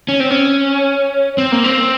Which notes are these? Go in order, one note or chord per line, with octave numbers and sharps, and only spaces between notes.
C#4
C4
C#4
C4
A#3
C4